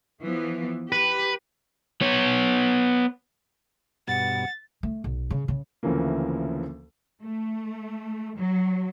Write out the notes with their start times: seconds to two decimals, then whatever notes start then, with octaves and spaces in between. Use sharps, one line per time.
0.21 E3 F3 B3
0.92 G4 B4
2.01 B3 C#5
4.08 G2 B2 F#5 A6
4.83 A3
5.04 B1
5.31 C#3
5.48 C#3
5.83 D2 C#3 E3 F3 A#3
7.22 A3
8.37 F#3